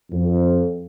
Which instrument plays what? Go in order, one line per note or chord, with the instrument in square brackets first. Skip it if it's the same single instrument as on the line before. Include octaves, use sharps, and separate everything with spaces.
[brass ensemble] F2